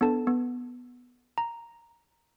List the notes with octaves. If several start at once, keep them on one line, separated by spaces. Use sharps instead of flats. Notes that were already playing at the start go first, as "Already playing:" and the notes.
B3 D4 A4 A5
B3
A#5